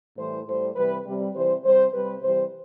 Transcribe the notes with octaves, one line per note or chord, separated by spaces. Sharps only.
A2 E3 G3 C5
A2 G3 C5
C3 E3 G3 B4
C3 G3
C3 E3 G3 C5
C3 G3 C5
C3 G3 B4
C3 E3 G3 C5